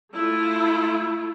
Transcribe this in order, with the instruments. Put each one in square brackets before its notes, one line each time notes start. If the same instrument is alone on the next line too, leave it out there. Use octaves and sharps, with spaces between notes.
[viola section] A3 E4 F4